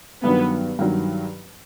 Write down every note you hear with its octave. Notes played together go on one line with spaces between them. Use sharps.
G2 D#3 F#3 B3
G2 D#3 F#3